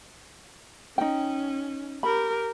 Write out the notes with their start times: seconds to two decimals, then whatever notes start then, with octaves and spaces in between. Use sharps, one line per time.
0.98 C#4 D#4 G5
2.03 G4 A#4 B5